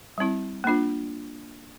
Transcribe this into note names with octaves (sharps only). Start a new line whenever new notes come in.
G3 C4 E4
A#3 D4 F4